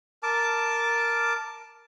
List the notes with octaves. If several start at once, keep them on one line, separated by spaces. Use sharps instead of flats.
A#4 A5 D6